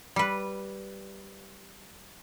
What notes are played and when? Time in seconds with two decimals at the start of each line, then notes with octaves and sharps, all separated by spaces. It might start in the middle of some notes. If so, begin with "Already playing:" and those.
0.16 G3 B4